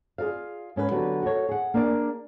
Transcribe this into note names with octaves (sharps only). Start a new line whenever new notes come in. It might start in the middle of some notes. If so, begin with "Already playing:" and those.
F4 G#4 A#4 D5 F5
G#2 C#4 D4 B4 C#5
D3 F#3 B3 G4 B4
F#4 A4 B4 C#5
G#4 F#5
A#3 D4 G#4 D5